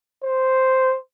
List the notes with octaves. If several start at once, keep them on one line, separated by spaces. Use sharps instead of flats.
C5